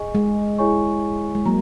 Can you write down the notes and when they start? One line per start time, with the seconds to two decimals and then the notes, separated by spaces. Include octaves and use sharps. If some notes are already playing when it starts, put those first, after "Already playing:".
Already playing: G#4 D#5 G#5 C#6
0.15 G#3
0.58 E4 G#4 C#5 G#5 C#6
1.35 G#3
1.46 F#3 A#3 A#5